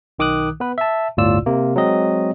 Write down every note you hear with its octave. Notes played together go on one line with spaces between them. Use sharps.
B1 D#3 D6 D#6 F#6
B3 B4
E5 A5
G1 D2 A2 F4 D5 E6
C3 A#3
F#3 G#3 C4 D#5